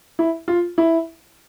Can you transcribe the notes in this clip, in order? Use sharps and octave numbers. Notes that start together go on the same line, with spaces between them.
E4
F4
E4